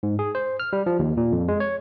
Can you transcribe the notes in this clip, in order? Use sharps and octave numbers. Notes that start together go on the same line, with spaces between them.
G#2
G#4
C5
F6
G3
F3
D#2
A#2
F2
G#3
C#5